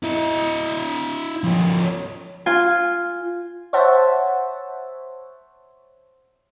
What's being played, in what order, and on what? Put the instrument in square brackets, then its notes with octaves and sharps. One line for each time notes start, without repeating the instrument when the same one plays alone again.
[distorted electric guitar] E4 D#5
F3 C#4
[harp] F4 G#5
[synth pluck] C5 C#5 E5 F#5 A5